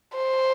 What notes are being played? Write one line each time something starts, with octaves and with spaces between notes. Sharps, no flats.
C5